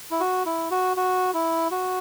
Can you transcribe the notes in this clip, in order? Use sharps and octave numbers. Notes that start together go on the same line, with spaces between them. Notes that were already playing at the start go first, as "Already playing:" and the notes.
E4
F#4
E4
F#4
F#4
E4
F#4